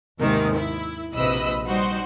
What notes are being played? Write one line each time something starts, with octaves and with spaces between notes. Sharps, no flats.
D#2 G#2 C3 D#3
E4
A#1 C3 B4 D#5 B5 E6
G3 D#4 F#4 C5